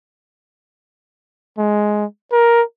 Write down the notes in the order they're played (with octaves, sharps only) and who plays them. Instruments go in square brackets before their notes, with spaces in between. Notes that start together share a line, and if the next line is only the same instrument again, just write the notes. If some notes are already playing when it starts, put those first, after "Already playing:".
[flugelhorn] G#3
A#4